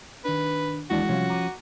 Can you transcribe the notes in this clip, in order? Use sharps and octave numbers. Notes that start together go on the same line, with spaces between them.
D#3 D4 B4
D#2 E3 G#3 D4 E4 F#4
C3 F3 G3 C#4 F5
A#5 D6 D#7